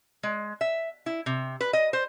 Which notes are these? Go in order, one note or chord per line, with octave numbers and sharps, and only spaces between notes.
G#3
E5
E4
C3
B4
D#5
C5